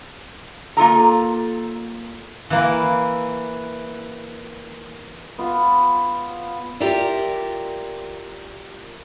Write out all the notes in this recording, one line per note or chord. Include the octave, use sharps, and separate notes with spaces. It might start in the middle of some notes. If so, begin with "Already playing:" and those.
A#3 F4 A4 A#5
E3 A#3 E4
B3 F4
F4 G4 A#4 D5 E5